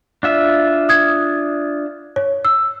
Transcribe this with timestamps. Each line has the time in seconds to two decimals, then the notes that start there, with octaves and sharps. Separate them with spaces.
0.23 D4 F4 E5
0.89 D#6 G#6
2.16 C#5
2.45 E6